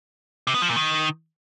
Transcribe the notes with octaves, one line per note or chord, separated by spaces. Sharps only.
C3
B3
F3
A#2
D#3